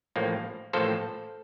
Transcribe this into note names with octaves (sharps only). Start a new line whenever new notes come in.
A1 A2 F3 A#3
A1 A2 F3 A#3 A4 C5